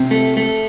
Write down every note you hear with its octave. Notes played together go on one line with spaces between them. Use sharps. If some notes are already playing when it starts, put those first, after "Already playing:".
Already playing: C3
A3
A3